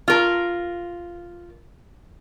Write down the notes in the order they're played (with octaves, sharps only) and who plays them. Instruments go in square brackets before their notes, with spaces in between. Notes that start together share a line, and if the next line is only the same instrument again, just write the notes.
[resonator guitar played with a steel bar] F4 A#4